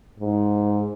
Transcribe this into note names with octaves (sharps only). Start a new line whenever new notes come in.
G#2